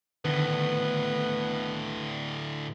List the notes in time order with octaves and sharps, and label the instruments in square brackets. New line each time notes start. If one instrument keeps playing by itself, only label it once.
[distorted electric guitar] D2 A2 [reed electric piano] D3 D#3 [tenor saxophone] B3